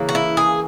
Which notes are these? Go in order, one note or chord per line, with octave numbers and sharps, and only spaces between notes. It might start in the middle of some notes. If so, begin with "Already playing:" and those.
Already playing: C#3 E3 A#3
F#4
E4
G#4